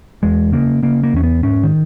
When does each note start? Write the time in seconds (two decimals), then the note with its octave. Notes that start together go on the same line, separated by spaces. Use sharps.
0.23 E2 G#3
0.52 C#3 A#3
0.83 C#3 A#3
1.04 A#3
1.13 E2 C#4
1.23 B3
1.43 G#2 C#4
1.64 D#3